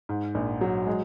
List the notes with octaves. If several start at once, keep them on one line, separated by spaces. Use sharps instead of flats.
G#2
A#1
F#3
G#3